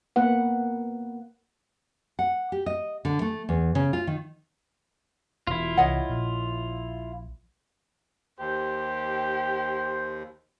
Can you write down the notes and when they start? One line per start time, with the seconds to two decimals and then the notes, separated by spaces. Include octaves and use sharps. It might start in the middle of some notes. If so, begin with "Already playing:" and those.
0.16 A#3 B3 B4 F#5
2.19 F#5
2.52 G4
2.66 D#5
3.05 D3
3.21 A3
3.49 E2
3.75 C#3
3.93 F4
4.07 D#3
5.47 E1 E4 F4
5.77 C2 E3 C#5 D#5 F#5
6.09 A#1
8.39 D#2 G4 C5